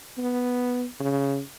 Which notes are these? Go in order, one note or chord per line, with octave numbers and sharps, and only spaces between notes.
B3
C#3